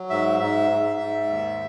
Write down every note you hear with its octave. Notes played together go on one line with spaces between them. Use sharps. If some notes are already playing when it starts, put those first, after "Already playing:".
Already playing: F#3
G#2 E5
G#2 E5
G#2
G#2
D#2